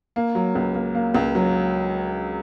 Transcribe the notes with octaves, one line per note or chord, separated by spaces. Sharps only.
A#3
F#3
C#2
A#3
A#3
C#2
F#3